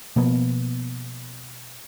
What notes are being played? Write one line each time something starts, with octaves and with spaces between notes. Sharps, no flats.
B2 F3 A#3 B3